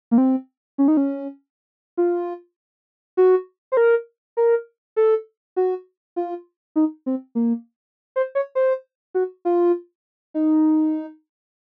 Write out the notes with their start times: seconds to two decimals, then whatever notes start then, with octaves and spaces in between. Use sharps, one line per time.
0.11 A#3
0.18 C4
0.78 C#4
0.88 D#4
0.97 C#4
1.97 F4
3.17 F#4
3.72 C5
3.77 A#4
4.37 A#4
4.96 A4
5.56 F#4
6.16 F4
6.76 D#4
7.06 C4
7.35 A#3
8.16 C5
8.35 C#5
8.55 C5
9.15 F#4
9.45 F4
10.34 D#4